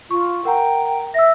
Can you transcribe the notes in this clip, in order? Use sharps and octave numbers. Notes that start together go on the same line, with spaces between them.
F4 C#6
A#4 F#5 G5 A#5
E5 E6 A#6